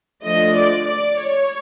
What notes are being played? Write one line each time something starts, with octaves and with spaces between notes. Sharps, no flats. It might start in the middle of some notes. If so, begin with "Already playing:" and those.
D3 F3 A3 D#5
D5
D5
C#5